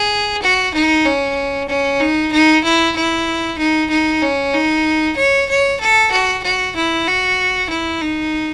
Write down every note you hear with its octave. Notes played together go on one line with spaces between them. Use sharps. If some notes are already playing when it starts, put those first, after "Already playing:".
Already playing: G#4
F#4
D#4
C#4
C#4
D#4
D#4
E4
E4
D#4
D#4
C#4
D#4
C#5
C#5
A4
F#4
F#4
E4
F#4
E4
D#4